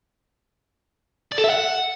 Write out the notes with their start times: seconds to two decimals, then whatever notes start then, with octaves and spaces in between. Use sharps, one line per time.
1.32 D5
1.38 A4
1.44 E5
1.50 F#5